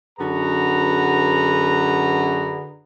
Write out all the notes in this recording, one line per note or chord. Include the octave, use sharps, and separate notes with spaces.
F#2 D3 F#4 G#4 B4 A#5